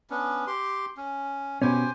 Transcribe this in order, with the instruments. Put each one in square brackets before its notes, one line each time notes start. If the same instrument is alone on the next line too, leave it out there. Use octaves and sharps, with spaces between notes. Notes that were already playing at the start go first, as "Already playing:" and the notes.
[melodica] B3 C#4 D4
G4 C6
C#4
[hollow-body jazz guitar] B2 C#4 [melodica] G4 C5 G#5